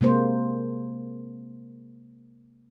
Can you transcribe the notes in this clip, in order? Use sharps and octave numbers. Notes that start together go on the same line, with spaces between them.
C3 G#3 A#3 C5